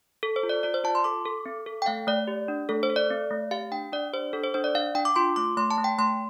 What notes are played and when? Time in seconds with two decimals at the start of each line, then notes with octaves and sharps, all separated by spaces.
0.23 A4
0.36 C5
0.43 F4
0.49 D5
0.63 F4 D5
0.74 C5
0.84 F4 A5
0.95 C6
1.04 A4 D6
1.26 A4
1.46 C4
1.66 A4
1.82 G5
1.86 A3 F5
2.07 A3 D5
2.28 G4
2.48 D4
2.69 A3 A4
2.83 C5
2.90 A4
2.96 D5
3.10 C4
3.31 A3
3.51 G4 F5
3.71 D4 G5
3.93 D4 D5
4.13 G4 C5
4.33 D4 A4
4.44 C5
4.54 D4 C5
4.64 D5
4.75 D4 F5
4.95 D4 G5
5.05 D6
5.16 F4 C6
5.36 A3 D6
5.57 A3 C6
5.71 A5
5.78 A3
5.84 G5
5.98 A3 C6